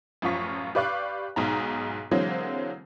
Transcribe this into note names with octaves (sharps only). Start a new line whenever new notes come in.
A1 F#2 F3 F4 C#6 B6
G4 B4 D5 F5 C#6 F#6
B1 G#2 D#4 A#5
D3 E3 F#3 G#3 A#3 C4